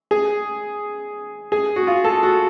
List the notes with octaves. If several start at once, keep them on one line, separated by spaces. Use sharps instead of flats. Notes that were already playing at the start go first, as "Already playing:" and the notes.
G#4
G#4
F#4
F4
A4
F#4